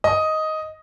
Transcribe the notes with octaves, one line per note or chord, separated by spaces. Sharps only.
D#5